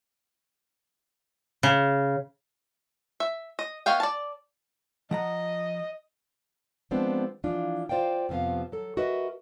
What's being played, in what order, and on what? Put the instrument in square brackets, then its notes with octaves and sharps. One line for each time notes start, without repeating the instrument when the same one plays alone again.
[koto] C#3
[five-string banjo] E5
D#5
B3 C#5 D#5 F5 G5
D5 A5
[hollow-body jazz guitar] F3 F#5 A#5 [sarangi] D#5
[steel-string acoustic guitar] F3 G#3 B3 C4 D4
E3 F3 D4 F4
F4 C5 D5 F5 G5
F2 C3 F3 B3 F5
F#3 A4
F#4 A#4 B4 D#5 E5